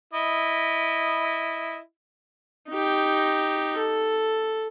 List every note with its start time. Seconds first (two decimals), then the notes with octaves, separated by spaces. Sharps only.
0.13 E4 D#5
2.69 D#4 G4
3.77 A4